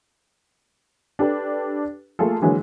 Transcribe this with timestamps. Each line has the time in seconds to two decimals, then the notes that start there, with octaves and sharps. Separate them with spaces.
1.19 D4 G4 A4 B4
2.19 A3 A#3 F4 G#4 A4
2.42 D3 E3 F#3 G#3 A#3